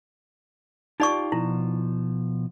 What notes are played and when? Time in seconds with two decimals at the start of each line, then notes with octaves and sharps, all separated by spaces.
1.00 D#4 F4 G4 D5 C#6
1.32 B2 F3 E4